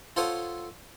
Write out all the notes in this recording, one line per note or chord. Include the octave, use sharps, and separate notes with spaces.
F4 A4 C5 C#5 F#5 D#6